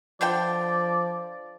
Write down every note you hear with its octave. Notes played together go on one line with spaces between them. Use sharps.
D3 F3 D4 D5 G5